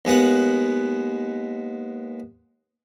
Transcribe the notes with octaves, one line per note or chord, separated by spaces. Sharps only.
D#2 G#3 B3 F#5